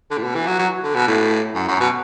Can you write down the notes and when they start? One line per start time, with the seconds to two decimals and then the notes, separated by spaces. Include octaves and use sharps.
0.11 D3
0.17 A2
0.23 B2
0.35 E3
0.47 F#3
0.59 F#3
0.84 D3
0.94 B2
1.07 A2
1.55 F#2
1.68 F#2
1.80 B2